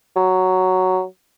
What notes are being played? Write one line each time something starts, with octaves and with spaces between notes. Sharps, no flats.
F#3